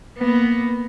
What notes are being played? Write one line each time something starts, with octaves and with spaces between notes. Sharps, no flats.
A#3 B3